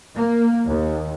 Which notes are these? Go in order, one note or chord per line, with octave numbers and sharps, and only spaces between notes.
A#3
D#2